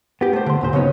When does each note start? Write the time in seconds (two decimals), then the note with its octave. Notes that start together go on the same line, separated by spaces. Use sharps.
0.21 B3 G4
0.33 A3 C5
0.46 D3 C6
0.61 D#2 A#2 C5
0.73 C#3 F#3 B3 C#4 D#4